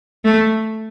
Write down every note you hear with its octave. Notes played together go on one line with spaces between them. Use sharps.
A3